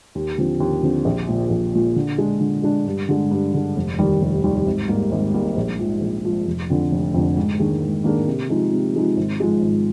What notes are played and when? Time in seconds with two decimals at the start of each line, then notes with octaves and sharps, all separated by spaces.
0.15 D#2
0.38 D3 F3 C4
0.60 D#2
0.83 D3 F3 C4
1.05 A#1
1.28 A#2 F3
1.50 A#1
1.73 A#2 F3
1.96 D3
2.18 G#3 D4
2.41 D3
2.63 G#3 D4
2.86 G2
3.09 D3 G#3
3.31 G2
3.54 D3 G#3
3.76 F1
3.98 D#2 D#3 G3
4.22 F1
4.44 D#2 D#3 G3
4.66 G#1
4.88 G#2 G3 A#3
5.12 G#1
5.34 G#2 G3 A#3
5.57 A#1
5.79 G#2 F3
6.01 A#1
6.25 G#2 F3
6.46 F1
6.70 F2 D3
6.91 F1
7.14 F2 D3
7.37 G#2
7.59 D#3 A#3 D4 G#4
7.82 G#2
8.04 D#3 A#3 D4 G#4
8.28 C3
8.49 F3 G#3 D#4
8.73 C3
8.95 F3 G#3 D#4
9.17 G#1
9.40 G#2 F3 G#3
9.62 G#1